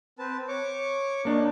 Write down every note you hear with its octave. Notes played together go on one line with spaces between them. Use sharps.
C4 B4 A5
C#5 C#6 D6
A#3 D4 D#4